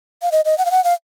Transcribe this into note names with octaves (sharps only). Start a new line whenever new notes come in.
F5
D#5
D#5
F#5
F5
F#5
F5